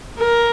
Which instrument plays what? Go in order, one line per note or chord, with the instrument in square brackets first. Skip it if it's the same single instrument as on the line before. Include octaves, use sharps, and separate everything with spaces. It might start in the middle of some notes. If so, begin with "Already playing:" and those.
[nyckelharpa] A#4